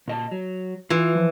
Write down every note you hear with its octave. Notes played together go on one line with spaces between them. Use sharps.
A#2 D#5 A5
F#3
E3 F4
F3